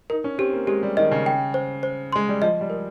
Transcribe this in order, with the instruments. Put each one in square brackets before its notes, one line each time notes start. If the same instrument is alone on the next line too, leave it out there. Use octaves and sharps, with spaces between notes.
[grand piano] D#4 [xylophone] A#4
[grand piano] C#4
[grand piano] C4 [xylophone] G4
[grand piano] A#3
[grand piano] G#3 [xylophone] G4
[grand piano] G3
[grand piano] D#3 [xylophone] D#5
[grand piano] C#3
[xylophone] G5
C5
C5
[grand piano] G#3 [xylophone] C6
[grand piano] G3
[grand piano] F3 [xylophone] D#5
[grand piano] G3
[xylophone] A#4